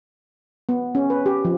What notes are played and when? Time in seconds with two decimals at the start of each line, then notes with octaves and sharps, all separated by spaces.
0.69 B3
0.95 C#4
1.10 B4
1.26 G4
1.45 F3